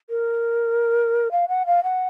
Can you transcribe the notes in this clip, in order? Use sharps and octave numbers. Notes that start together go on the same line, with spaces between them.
A#4
F5
F#5
F5
F#5